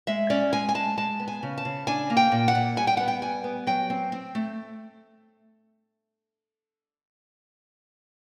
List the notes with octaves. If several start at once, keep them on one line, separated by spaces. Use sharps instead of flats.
G#3 E5
C#4 D5
G#3 G#5
G#5
G#3 A5
G#3 A5
B3
G#5
C#3
A5
C#3
D4 G#5
A#3
G5
A#2
F#5
A#2
G3 G#5
G5
B3 F#5
G5
G3 G#5
B3
F#3 G5
C4
C4
A3